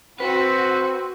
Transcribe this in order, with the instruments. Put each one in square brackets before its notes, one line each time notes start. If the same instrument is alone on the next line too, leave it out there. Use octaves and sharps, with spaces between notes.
[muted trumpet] C4 [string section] F#4 [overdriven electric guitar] B4